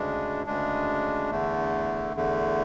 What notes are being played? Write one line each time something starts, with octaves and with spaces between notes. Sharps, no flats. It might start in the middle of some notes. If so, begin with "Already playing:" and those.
Already playing: D2 C#3 G#3 D4
D2 C#3 G#3 D4
E2 D3 A3
E2 D3 A3